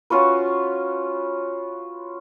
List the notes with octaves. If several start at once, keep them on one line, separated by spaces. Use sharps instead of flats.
C#4 F4 F#4 B4